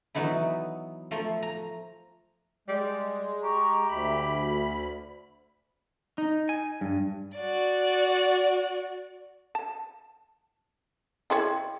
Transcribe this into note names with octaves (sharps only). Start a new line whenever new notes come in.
E3 F#3 B3 D#4 E4
F3 A3 A#5
A#5
G3 G#3
G4 A#5 C#6
D2 E5 B5
D#4
G#5
G2
F#4 D5
A5
E4 G#4 C#5 D#5 G5 C6